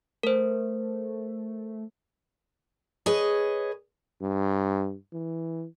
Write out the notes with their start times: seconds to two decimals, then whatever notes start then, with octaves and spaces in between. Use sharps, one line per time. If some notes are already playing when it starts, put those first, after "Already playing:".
0.23 A3 A#4 C5
3.06 G#4 B4 C#5 D#5
4.22 G2
5.13 E3